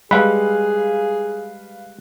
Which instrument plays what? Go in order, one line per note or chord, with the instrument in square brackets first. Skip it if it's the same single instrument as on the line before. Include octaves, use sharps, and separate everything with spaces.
[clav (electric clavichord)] G3 G#3 [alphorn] G#4 [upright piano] B4 F5 F#6 [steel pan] B5